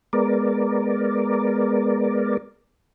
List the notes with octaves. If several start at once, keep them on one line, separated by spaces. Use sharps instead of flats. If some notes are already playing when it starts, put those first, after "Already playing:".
G#3 B3 A#4 D5